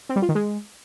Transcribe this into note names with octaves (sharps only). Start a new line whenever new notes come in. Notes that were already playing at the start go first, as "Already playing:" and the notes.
C4
G3
F4
D#3
G#3